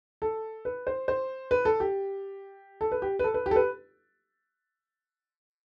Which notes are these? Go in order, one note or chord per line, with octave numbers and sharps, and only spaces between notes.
A4
B4
C5
C5
B4
A4
G4
A4
B4
G4
B4
A4
B4
G4
A4
B4